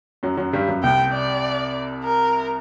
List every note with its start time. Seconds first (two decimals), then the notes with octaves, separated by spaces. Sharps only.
0.23 F#2 F#3
0.37 F#2 F#3
0.53 G2 G3
0.68 F#2 F#3
0.83 C2 C3 G5
1.13 D5
2.04 A#4